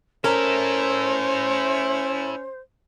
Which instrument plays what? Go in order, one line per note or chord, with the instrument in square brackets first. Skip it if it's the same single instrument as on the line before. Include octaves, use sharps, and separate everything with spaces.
[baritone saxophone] C#4 [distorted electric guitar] E4 A4 [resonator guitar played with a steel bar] A#4 [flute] C5